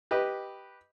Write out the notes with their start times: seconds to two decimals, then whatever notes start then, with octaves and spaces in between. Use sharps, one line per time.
0.11 G4 B4 D#5